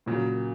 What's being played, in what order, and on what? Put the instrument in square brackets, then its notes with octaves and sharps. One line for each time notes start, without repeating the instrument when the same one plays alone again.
[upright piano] A#2 [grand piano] C#3 F#3